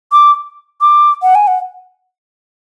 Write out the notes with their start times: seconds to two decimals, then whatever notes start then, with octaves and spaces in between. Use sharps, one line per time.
0.12 D6
0.81 D6
1.22 F#5
1.35 G#5
1.47 F#5